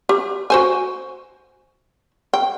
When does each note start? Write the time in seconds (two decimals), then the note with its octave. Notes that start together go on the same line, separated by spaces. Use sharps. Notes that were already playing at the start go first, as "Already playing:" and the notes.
0.09 G4
0.50 F#4 C5 G#5
2.33 G5